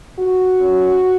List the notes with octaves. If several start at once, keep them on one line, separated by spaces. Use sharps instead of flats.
F#4
F#3 C#4